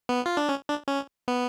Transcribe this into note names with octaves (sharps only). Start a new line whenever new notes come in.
B3
F4
D4
C#4
D4
C#4
B3